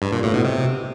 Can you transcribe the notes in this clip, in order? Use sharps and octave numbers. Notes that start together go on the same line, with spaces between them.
G2
A#2
A2
B2
C3